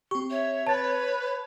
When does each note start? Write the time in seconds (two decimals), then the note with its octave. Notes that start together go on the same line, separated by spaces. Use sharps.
0.11 C4 G4 C#6
0.30 C#5 E5
0.67 B4 A5 A6